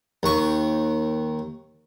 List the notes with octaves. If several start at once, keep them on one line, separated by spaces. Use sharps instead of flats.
D#2 C#6